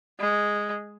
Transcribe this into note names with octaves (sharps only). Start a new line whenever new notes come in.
G#3